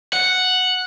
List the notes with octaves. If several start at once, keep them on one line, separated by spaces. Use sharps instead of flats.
F#5